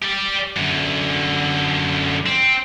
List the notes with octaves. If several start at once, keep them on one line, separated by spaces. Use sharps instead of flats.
G4 D5
F#2 D3
C4